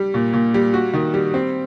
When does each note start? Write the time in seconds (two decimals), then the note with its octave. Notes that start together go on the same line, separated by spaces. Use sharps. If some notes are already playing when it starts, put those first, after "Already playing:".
Already playing: G3
0.14 A#2
0.33 A#2
0.54 G3
0.74 F#4
0.93 D#3
1.14 G3
1.34 C4